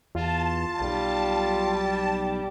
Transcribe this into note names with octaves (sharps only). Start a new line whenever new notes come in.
E2 F4 A5
B1 G3